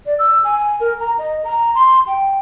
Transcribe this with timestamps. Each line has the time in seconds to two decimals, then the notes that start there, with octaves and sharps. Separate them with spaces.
0.06 D5
0.19 E6
0.44 G#5
0.80 A#4
1.00 A#5
1.19 D#5
1.44 A#5
1.75 C6
2.07 G5